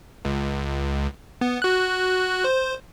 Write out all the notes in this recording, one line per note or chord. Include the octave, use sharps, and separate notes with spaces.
C#2
B3
F#4 F#6
C5